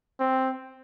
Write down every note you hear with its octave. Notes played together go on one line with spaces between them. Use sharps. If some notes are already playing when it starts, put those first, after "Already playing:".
C4